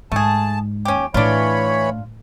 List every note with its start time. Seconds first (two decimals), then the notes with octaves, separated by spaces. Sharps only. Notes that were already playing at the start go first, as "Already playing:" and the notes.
0.12 G#2 A3 G#4 A5
0.85 D#2 C#4 G4
1.14 A2 E3 D4 F4 C#5 B5